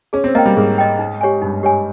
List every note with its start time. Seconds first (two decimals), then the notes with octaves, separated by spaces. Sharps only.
0.13 C#4 G#4
0.24 C4
0.35 A#3 D#5 G5
0.46 G3
0.56 G#2 G#4
0.78 D#5 G5
0.99 D#4
1.21 G4 C#5 G#5
1.42 G2 D#4
1.63 G4 C#5 G#5